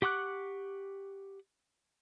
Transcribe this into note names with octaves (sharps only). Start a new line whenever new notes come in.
G4 F#5 C#6 D6 F#6